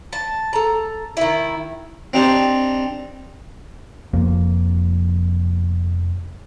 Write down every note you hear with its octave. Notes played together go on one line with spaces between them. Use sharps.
A5
A4 A#5
D#3 E4
C4 D4 D#4 G4 C5 A5
F1 F2 F3 A#3